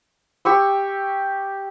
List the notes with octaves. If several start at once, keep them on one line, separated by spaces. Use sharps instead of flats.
G4 C#6 E6